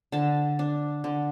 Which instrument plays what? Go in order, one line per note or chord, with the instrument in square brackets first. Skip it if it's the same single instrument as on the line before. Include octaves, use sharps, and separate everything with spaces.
[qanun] D3 A5
D4
D3